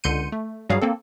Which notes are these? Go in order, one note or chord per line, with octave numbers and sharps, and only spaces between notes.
C#2 D3 C6 G6 C#7 D#7
A3
G2 F#3 G3 F#4 G#4 F5
A#3 C4 A4